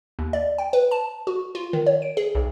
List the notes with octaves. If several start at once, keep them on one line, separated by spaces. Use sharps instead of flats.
D#2
D5
G5
B4
A5
F#4
F4
D#3
C#5
D7
G#4
B1